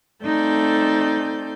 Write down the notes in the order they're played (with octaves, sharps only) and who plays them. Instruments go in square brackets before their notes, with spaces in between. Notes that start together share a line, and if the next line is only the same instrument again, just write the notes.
[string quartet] A3 C4 D#4 A4 D5 G6